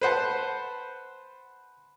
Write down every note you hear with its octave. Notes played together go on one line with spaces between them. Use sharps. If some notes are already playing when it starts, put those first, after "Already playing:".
B4 C5 F#5 A5